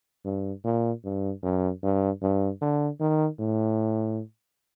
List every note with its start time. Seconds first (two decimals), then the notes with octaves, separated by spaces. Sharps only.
0.25 G2
0.64 A#2
1.04 G2
1.43 F#2
1.83 G2
2.22 G2
2.62 D3
3.00 D#3
3.39 A2